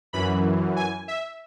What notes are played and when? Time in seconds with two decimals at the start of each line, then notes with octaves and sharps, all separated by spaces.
0.13 F#2 E3 B5
0.76 G#5
1.08 E5